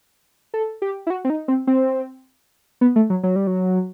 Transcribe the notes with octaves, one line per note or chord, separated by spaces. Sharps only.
A4
G4
E4
F#4
C4
D#4
C4
C4
B3
A3
F#3
F#3
G3
F#3